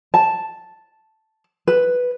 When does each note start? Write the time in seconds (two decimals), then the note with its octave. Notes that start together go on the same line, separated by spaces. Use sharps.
0.14 A5
1.67 B4